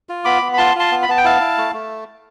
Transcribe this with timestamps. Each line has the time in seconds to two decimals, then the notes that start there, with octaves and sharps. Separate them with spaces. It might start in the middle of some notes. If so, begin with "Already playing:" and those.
0.09 F4
0.25 B3 B5 D6
0.42 B3
0.54 B5
0.58 F4 A5 C6
0.75 F4 A5 C6
0.91 B3
1.02 B5
1.08 B3 A5
1.17 G5
1.24 E4 F5 A5
1.41 E4
1.58 A3
1.74 A3